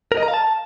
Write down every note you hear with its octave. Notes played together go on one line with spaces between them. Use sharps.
A#4
D#5
A#5
F5
A5